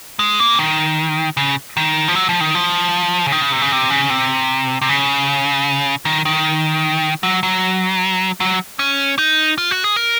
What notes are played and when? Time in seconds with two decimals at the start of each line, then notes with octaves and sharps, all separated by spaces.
0.19 G#3
0.40 A#3
0.54 C#3
0.58 D#3
1.37 C#3
1.77 D#3
2.08 F3
2.15 F#3
2.29 F3
2.41 D#3
2.55 F3
3.26 C#3
3.32 D#3
3.42 C#3
3.52 C3
3.62 C#3
3.72 C3
3.90 C#3
4.10 C3
4.82 C3
4.89 C#3
6.05 D#3
6.25 D#3
7.23 F#3
7.43 F#3
8.40 F#3
8.79 C#4
9.18 D#4
9.58 F4
9.71 F#4
9.84 G#4
9.96 A#4